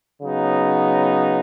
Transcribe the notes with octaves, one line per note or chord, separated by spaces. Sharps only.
C#3 F#3 B3 D#4